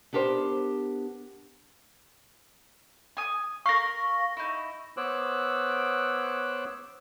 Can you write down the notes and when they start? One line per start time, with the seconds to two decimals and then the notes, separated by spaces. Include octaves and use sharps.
0.13 B3 D4 G4 A#4 C5
3.17 G#5 D#6
3.66 A#4 F5 C#6 A#6
4.37 D#4 E4
4.97 B3 C5 C#5 D6 E6 F#6